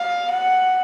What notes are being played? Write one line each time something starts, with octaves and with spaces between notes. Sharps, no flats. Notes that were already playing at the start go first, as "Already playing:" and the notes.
Already playing: F5
F#5